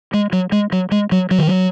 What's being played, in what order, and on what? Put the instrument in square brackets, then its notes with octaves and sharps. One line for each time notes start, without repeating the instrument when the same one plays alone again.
[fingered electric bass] G#3
F#3
G#3
F#3
G#3
F#3
F#3
D#3
F#3